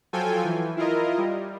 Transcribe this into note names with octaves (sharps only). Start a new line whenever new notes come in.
F3 F#3 F4 A4 G5 G#5
E3
E4 F4 A#4 D#5
G3